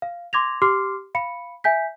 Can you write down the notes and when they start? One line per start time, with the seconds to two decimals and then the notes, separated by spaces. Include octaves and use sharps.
0.02 F5
0.33 C6 D6 G#6 A#6 F7
0.62 G4 C6 D6 F6 C7
1.15 F5 B5 C#7
1.64 E5 G#5 G6 B6